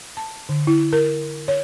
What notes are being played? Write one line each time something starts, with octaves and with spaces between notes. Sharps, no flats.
A5
D3
E4
A#4
C#5